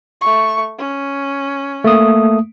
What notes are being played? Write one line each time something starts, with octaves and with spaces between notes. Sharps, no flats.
A3 C#6
C#4
A3 A#3 D#6